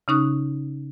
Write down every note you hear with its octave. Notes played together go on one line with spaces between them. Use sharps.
C#3 C#4 D#4 C#6 D#6 F#6